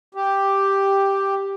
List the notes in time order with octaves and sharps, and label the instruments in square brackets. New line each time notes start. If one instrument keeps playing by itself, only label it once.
[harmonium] G4